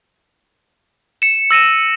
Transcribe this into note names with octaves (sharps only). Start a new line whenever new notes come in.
C#7 E7
E6 A#6 D#7 E7